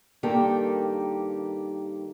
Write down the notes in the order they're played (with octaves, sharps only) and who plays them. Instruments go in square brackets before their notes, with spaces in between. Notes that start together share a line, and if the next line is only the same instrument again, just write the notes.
[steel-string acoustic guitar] G2 D#3 A#3 G4 A4